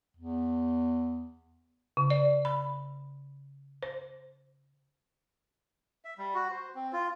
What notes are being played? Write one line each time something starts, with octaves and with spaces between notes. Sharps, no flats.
E2
C#3
D5
B5
C5
E5
G3
F#4
C5
C4
F4